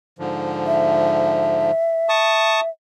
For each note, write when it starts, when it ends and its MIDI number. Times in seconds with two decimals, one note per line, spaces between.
0.19 1.71 44
0.19 1.71 50
0.19 1.71 53
0.67 2.69 76
2.09 2.60 81
2.09 2.60 85
2.09 2.60 87